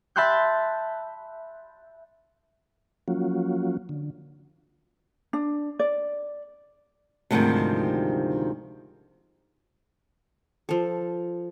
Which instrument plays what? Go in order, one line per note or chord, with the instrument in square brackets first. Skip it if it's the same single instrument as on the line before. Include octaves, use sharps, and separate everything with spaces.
[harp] E5 A5 B5 C6 F#6 G6
[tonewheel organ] F3 F#3 A#3 C#4 F4 F#4
D3
[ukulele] D4
D5
[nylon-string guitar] D2 G#2 C3 D#3 F3 G3
[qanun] F3 A4